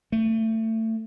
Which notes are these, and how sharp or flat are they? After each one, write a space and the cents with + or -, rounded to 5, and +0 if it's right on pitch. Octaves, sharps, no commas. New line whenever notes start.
A3 +25